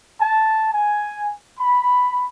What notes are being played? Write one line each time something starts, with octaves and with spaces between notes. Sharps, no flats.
A5
G#5
B5